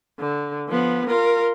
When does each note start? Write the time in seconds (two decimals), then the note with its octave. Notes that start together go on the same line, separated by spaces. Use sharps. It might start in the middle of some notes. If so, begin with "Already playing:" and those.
0.19 D3
0.69 F3 B3
1.07 F4 A#4